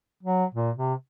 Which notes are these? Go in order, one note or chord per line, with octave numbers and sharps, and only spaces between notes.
F#3
A#2
C3